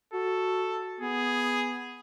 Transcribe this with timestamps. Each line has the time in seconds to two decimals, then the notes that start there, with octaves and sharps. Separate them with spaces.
0.13 F#4 A4
1.01 B3 G#4